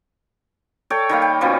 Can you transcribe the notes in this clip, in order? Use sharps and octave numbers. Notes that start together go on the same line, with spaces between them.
A4 C#5 D5 G5
D#3 G3 A#3
G5
B2 F3 G3 C#4